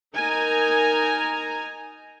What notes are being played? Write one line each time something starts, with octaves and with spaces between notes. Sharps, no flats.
D#4 A#4 G#5 A#5